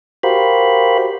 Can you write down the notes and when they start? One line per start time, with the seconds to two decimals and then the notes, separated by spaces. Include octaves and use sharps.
0.23 F#4 G4 A#4 C5 F5 B5